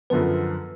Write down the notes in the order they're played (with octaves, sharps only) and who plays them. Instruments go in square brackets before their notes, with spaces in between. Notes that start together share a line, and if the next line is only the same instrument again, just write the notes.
[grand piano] F#2 D3 F3 B3 [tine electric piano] B4